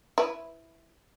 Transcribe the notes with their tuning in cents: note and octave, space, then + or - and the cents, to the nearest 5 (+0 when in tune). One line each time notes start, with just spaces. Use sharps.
E4 +0 B4 +0